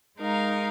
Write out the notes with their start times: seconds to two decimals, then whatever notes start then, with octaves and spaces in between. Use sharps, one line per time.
0.18 G#3 D#4 A#4 F5